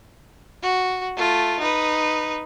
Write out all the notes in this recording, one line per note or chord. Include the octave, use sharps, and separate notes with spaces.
F#4
A3 F4
D#4 B4